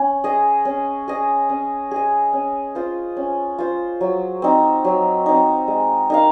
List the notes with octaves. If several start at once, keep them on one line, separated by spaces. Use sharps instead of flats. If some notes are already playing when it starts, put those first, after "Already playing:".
Already playing: C#4
G#4 D#5
C#4
G#4 D#5
C#4
G#4 D#5
C#4
F4 C5
C#4
F4 C5
F#3
C4 D#4
F#3
C4 D#4
G#3
D#4 A#4 F5